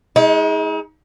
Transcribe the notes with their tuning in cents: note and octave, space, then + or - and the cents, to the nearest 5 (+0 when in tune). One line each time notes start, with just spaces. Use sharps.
G#3 +0 D#4 +45